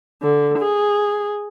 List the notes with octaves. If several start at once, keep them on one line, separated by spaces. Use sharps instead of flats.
D3
G#4